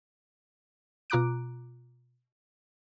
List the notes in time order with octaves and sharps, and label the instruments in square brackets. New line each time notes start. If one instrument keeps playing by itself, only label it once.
[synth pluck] B2 F4 A#5 D6 F#6 D7